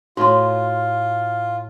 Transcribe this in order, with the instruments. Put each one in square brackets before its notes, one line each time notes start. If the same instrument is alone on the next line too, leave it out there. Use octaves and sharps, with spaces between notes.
[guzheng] A2 [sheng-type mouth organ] F4 [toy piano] F#4 C6